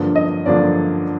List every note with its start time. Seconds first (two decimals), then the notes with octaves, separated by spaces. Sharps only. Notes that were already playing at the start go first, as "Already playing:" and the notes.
Already playing: G2 D3 F3 A#3 D4
0.16 D#5
0.46 G2 D3 F3 A#3 D4 D5